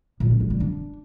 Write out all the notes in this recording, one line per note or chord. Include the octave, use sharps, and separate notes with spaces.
A#2
C#4
A#2
G3
D4